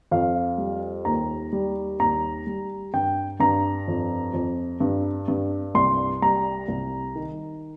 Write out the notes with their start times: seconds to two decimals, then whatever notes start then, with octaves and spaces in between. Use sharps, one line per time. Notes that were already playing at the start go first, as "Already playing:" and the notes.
0.11 F2 F5
0.58 G3
1.05 D#2 A#5
1.52 G3
1.99 D#2 A#5
2.47 G3
2.93 G2 G5
3.40 G2 A#5
3.88 F2
4.34 F2
4.80 G2
5.28 G2
5.75 C2 C6
6.22 G3 A#5
6.68 C2
7.16 D#3